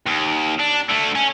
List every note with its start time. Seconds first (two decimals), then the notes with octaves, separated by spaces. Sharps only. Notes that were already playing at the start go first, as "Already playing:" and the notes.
0.06 D#2
0.60 D4
0.90 D3 A3
1.15 C#4